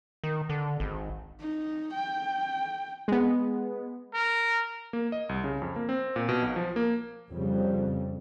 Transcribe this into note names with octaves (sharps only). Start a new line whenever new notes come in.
D#3
D3
G#1
D#4
G5
G#3 B3
A#4
A#3
D#5
C2
C#3
F2
A#3
C4
A#2
B2
B1
F3
A#3
F2 C#3 G3